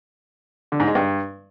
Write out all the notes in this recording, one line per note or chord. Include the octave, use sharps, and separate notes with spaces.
D3
G#2
G#3
G2